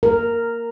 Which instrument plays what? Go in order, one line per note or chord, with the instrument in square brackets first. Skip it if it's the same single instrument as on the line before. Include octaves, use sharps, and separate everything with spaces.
[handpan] A#4